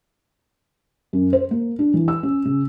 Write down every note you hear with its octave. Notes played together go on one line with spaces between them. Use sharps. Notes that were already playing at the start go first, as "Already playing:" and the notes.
F#2
C5
A#3
D4
E3
E6
C#4
C#3